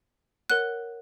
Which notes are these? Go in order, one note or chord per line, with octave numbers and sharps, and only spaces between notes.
A#4 C#5 F#5 F#6